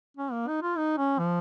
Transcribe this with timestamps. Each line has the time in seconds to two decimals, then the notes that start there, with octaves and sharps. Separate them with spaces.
0.17 C#4
0.32 A#3
0.48 D#4
0.62 F4
0.77 D#4
0.98 C#4
1.19 F3